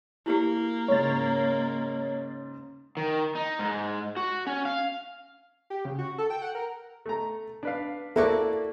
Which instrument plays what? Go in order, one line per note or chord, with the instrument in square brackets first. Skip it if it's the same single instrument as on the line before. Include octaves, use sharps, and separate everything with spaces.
[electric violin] A#3 [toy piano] E4 F#4 G4
[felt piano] G#2 C#3 [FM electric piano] C#5 A6
[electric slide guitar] D#3
D#4
G#2
F#4
C#4
F5
[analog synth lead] G4
C#3
F#4
A4
G5
F#5
A#4
[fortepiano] A3 A#5
D4 B4 F5
[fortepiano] A#3 [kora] E4 F#4 D5 [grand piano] A4